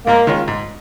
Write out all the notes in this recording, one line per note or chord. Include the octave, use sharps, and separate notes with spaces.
G#2 A#3
D#3 G#3 C#4 F4
G#2